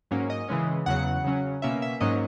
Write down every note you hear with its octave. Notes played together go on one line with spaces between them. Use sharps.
G#2 F#3 A#3 C#4
D#5
C#3 E3 G#3 C#4
E2 C#3 F#3 F#5
C#3 F#3 C#4
B2 A#3 C#4 E5
E5
G#2 F#3 A#3 C#4 D#5